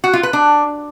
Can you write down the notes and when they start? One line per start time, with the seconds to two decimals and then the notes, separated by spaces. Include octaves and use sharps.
0.04 F#4
0.13 F4
0.23 B4
0.33 D4